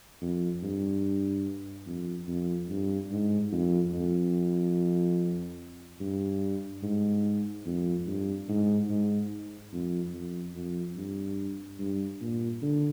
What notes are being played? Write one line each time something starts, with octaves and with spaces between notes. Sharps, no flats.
F2
G2
F2
F2
G2
G#2
F2
F2
G2
G#2
F2
G2
G#2
G#2
F2
F2
F2
G2
G2
A#2
D3